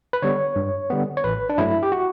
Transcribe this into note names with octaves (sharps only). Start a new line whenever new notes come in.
B4
D3 G3 B3 C#5
G2
D3 G3 B3
C#5
A1 B4
D4
G2 F#3 A3 E4
G4
F#4